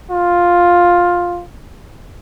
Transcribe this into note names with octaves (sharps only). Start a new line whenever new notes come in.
F4